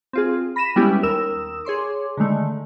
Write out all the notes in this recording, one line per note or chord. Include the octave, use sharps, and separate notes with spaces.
C4 F4 G#4
B5 A#6 B6 D#7 E7
G3 G#3 B3 C#4 E4 G4
D#2 A#4 D#6 E6 E7
G#4 C#5 C6 D6
D3 D#3 G#3 A3